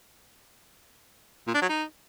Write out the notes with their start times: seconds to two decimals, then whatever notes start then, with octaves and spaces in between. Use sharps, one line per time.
1.47 A#2
1.54 D4
1.62 F#3
1.69 D#4